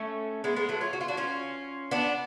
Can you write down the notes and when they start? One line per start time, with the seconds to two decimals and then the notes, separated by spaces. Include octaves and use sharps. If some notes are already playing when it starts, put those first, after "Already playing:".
Already playing: A3 C#4
0.44 G#3 B3
0.56 G#3 B3
0.69 F#3 A3
0.81 C#4 F4
0.93 F#4
1.01 F4
1.08 D4 F#4
1.17 C#4 F4
1.91 B3 D4